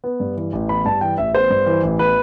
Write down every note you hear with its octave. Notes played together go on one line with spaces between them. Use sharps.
B3
G2
E3
A1
B3 B5
G2 A5
E3 G5
A1 E5
B3 C5
G2
E3
A1
B3 B4